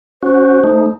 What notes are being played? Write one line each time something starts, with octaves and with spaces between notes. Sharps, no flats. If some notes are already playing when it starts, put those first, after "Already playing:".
C#4 F#4 C5
A3 D#4